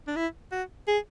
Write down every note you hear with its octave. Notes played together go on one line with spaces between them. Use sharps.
D4
E4
F#4
G#4